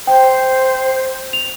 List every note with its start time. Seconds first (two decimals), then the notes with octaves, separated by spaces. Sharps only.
0.07 C5 G5
1.33 F7